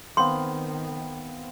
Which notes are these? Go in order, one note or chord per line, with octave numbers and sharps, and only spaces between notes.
D#3 B3 C4 F5 C6